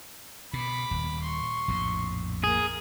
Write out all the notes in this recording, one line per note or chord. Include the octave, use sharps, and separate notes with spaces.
B2 B5 D6
D#1
C6 C#6
A#1 F2 A2
A#3 G#4